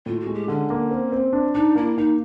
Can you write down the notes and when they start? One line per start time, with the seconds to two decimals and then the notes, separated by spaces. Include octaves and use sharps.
0.06 A2 F4
0.20 F#4
0.26 G#3
0.34 G4
0.48 D3 C#4
0.70 A#3
0.91 C4
1.12 C4
1.33 D4
1.55 D4 D#4
1.75 A#3 E4
1.97 A#3 D#4